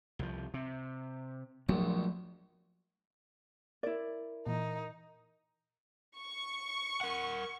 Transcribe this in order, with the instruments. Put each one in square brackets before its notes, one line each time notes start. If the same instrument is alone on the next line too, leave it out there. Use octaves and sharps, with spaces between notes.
[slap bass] C2 F3
C3
[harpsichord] A#1 [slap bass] F#3 A3 B3
[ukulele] E4 D5 [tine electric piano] A#4
[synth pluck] A#2 E3 [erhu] D#4
[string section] C#6
[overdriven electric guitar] A#4 F#5